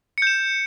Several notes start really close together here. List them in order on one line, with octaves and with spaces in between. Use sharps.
C#7 G6 E7